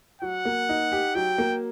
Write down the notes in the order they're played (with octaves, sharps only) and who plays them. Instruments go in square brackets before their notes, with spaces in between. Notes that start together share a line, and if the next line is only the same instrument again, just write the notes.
[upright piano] F#3 [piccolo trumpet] F#5
[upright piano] A#3
D#4
G4
[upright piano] F#3 [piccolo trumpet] G5
[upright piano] A#3